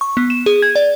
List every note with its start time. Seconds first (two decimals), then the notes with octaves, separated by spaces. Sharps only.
0.01 C#6
0.17 B3
0.30 E7
0.46 G#4
0.62 G#6
0.76 D5